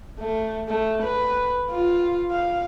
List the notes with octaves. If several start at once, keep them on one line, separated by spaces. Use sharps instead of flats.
A3
A3
B4
F4
F5